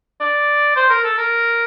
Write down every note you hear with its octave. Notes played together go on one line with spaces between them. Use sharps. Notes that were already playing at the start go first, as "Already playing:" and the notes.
D5
C5
A#4
A4
A#4